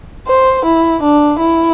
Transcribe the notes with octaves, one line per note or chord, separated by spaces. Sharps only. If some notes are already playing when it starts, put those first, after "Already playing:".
C5
E4
D4
E4